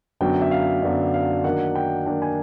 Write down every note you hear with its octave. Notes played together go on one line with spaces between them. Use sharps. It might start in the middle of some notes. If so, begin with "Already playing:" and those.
F#2 D3 F#3 B3 D4 G5
E5
F5
F#2 D3 F#3 B3 D4
F5
D#3 F#3 A#3 D4 F#5
G5
D#3 F#3 A#3 D4 G5
G#5